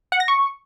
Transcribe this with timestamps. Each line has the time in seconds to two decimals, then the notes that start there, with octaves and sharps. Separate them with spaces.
0.12 F#5
0.20 A#6
0.28 C#6